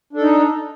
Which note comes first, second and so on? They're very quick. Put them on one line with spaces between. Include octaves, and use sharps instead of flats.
D4 A4 D#4